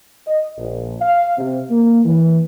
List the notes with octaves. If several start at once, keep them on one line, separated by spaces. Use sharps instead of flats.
D#5
A#1
F5
C3
A#3
E3